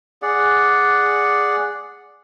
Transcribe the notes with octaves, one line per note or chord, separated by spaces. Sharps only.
G#4 D5 F#5